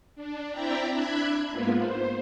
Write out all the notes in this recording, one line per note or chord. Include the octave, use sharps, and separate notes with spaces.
D4
C4 E4 D5 E5 G5 A#5
D4 E5 B5 F#6 G#6
G#2 A#3 B3 F4
C5